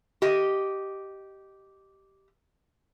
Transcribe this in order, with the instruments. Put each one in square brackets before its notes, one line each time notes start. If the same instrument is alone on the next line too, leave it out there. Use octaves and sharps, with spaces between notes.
[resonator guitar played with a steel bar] G4 D#5